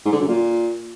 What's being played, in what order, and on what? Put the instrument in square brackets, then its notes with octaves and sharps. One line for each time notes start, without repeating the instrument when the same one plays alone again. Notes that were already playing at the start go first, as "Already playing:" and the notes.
[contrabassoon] G#2
D3
F#2
A#2